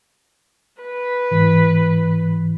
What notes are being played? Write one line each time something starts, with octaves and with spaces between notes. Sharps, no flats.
B4
G#2 E3